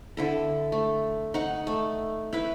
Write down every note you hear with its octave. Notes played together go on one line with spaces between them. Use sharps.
D3 E4 A4
A3
D#4 F#5
A3
E4 B4